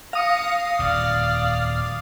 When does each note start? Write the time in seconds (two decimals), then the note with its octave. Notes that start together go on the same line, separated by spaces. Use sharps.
0.13 F5 D#6 A#6 C#7
0.79 D#1 F2 D5 F6